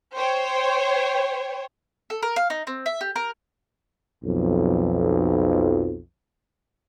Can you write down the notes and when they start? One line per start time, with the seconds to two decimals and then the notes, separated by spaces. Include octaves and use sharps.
0.17 C5 C#5 G5
2.10 A4
2.23 A#4
2.36 F5
2.50 D#4
2.67 C4
2.86 E5
3.01 G4
3.16 A#4
4.24 B1 F2